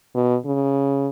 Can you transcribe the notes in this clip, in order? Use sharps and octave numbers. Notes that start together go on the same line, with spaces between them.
B2
C#3